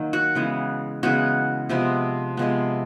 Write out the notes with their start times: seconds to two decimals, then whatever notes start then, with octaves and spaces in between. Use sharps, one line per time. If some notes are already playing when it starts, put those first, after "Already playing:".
Already playing: D#3 F#3 A#3
0.13 F#4
0.35 C#3 E3 G#3 B3
1.03 C#3 E3 G#3 B3 F#4
1.69 C3 F3 G#3 B3
2.37 C3 F3 G#3 B3